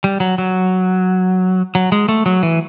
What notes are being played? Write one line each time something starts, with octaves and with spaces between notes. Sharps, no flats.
G3
F#3
F#3
F#3
G#3
A3
F#3
E3